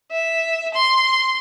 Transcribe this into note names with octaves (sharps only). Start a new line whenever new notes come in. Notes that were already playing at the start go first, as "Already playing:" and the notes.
E5
C6